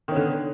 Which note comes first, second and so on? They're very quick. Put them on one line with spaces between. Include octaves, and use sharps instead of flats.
D#3 C#4 B3 D3